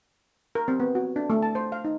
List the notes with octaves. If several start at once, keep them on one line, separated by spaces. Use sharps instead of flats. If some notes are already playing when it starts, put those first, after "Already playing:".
A#4
C4
B3
F#4
D4
A3
A5
C5
F5
D#4